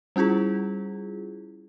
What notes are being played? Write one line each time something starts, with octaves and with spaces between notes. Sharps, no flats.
G3 C#4 E4 F4 G#4